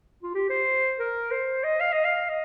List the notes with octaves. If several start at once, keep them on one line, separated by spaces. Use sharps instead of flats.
F4
G4
C5
A#4
C5
D#5
F5
D#5
F5
D#5